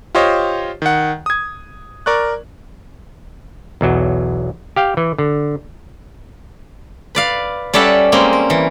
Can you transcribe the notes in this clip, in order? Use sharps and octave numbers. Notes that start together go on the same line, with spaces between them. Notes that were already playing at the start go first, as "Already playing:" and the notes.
F4 G4 C5 C#5 D#5
D#3 F#5
D#6 G#6
A#4 D5 C#6 F#6
B1 E2 F#3
G4 F5 G5
E3
D3
B4 D5 F5
G3 C#4 A4 D5 E5 F#5
G3 G#3 A#3 C4 C#4
A#4
E3